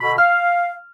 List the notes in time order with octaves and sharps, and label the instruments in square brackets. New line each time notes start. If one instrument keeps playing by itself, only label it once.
[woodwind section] B2 D3 B5
[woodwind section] F5 [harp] F6